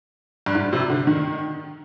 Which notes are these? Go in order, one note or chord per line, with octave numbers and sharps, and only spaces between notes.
G2
G#2
C3
D3
D#3